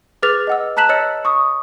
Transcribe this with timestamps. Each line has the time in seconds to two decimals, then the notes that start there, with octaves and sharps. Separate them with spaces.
0.22 G#4 B4 D6 F6 A6 F7
0.47 D#5 F#5 E6
0.77 A5 A#5 F#6 B6 E7 F#7
0.89 C#5 D#5 E6 F6 A6 C#7
1.25 C#6 D#6